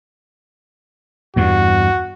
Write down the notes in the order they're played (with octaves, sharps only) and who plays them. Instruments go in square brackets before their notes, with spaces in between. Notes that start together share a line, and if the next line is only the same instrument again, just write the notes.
[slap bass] E2 G2 [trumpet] F#4